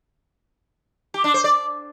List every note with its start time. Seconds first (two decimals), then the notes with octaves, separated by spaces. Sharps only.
1.14 G4
1.24 D4
1.34 C5
1.44 D5